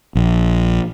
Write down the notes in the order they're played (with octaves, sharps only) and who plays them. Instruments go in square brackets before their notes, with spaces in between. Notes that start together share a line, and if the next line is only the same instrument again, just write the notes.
[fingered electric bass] A#1